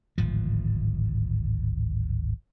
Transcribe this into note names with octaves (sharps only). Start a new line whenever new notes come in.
D1 G#1 F3